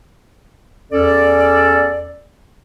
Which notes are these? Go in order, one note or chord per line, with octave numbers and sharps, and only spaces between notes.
E2 C#4 A4 D5